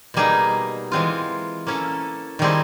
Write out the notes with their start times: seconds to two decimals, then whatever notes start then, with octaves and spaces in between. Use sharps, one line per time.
0.14 B2 G3 A#3 D#4 G#4
0.92 E3 G#3 C4 F4
1.67 A#3 C#4 E4 A4
2.39 D#3 G3 C4 E4 G#4